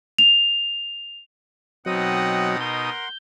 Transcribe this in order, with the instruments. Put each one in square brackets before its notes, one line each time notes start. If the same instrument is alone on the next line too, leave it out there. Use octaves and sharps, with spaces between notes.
[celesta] F7
[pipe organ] B2 D#4 D#6 [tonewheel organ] F#3 [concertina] C4 D#5 G5 [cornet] F#5
[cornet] A#4 [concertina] F#5 C6 [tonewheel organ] G6